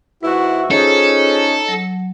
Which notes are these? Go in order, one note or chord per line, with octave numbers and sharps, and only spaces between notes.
G#2 E4 F#4 B4 E5 C#6
C#4 D#4 F4 G#4 A4 C5
F#3